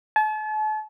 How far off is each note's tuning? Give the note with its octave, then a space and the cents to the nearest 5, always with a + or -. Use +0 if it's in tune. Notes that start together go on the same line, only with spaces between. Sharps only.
A5 -40